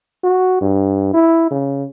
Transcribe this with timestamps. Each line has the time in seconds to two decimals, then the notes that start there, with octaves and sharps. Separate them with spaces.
0.23 F#4
0.61 G2
1.14 E4
1.51 C#3